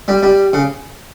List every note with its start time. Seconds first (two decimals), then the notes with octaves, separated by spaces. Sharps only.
0.08 G3
0.23 G3
0.53 C#3